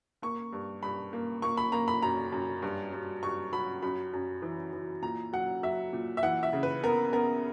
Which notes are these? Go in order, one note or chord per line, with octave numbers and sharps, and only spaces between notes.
A#3 C#6
G2
G2 B5
A#3
A#3 C#6
B5
A#3 A#5
B5
F#2 A#5
F#2
G2
G2
G2 C#6
F#3 B5
F#2 B5
F#2
E3
E3
A#2 A#5
F#3 F#5
F#3 E5
A#2
E5
E3 F#5
E5
C#3
B4
B3 A#4
B3 A#4